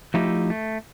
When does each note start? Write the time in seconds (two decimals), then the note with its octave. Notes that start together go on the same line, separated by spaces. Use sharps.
0.14 F3 A3 D#4 E4 G4
0.50 A3